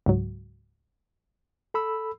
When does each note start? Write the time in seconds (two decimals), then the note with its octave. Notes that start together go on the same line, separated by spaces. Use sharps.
0.06 C#2 G#2 F#3
1.74 A4 B5 E6